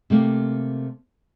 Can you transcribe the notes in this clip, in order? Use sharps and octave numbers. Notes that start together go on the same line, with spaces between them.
C3 A3 A#3